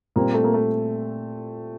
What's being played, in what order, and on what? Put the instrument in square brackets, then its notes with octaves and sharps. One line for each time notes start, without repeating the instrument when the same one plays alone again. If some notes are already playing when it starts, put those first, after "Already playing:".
[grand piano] A#2 G3 C4 [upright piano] A#3
[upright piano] A3
A#3
A3